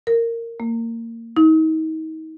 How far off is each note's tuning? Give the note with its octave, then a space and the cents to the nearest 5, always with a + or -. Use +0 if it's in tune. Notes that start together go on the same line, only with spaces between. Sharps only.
A#4 -15
A#3 -25
D#4 +35